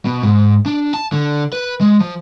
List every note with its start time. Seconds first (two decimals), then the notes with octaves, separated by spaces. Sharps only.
0.05 B2
0.23 G#2
0.66 D4
0.94 A5
1.12 D3
1.53 B4
1.81 G#3
2.00 F3